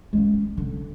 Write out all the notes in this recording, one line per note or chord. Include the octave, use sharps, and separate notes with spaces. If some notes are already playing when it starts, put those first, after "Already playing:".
G#3 C#4
D3